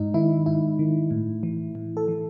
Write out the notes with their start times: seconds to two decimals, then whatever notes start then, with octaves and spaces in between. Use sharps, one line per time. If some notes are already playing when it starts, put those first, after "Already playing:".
Already playing: G#2 D#4
0.14 D#3 E4
0.46 G#2 E4
0.79 D#3
1.11 A2
1.43 E3
1.75 A2
1.97 A4
2.08 E3